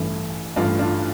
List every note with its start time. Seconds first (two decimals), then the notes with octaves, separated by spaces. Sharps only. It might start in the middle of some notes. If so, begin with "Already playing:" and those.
Already playing: A1 G2 E3 A3 E4
0.56 A1 G2 E3 A3 D4 F4
0.79 D4 F4